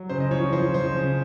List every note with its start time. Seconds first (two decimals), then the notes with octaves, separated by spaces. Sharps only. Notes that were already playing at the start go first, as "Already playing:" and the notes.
Already playing: F#3
0.09 C#3 C5
0.20 D#5
0.31 F3 C#5
0.53 F3 C5
0.74 F3 C5
0.96 C#3